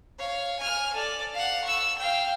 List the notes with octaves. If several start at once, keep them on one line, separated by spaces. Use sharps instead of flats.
C#5 F5
G#5 F6
A4 D5
F5 F#5
C#6 E6
F5 G5